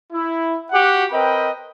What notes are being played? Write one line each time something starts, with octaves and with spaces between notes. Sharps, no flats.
E4
F#4 G4 F#5
C4 A#4 B4 D#5 G5 B5